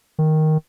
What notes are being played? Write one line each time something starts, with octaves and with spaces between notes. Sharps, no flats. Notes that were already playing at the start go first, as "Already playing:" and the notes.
D#3